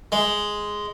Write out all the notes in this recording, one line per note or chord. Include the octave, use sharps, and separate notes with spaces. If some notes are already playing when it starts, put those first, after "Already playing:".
G#3